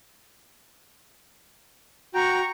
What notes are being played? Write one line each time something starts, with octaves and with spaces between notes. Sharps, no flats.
F#4 G5 A#5 C#6